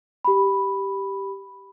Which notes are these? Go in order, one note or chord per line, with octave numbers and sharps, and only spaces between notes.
G4 B5